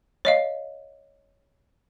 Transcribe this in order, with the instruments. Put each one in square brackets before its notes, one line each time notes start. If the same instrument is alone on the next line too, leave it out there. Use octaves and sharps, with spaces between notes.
[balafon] C#5 D#5 F5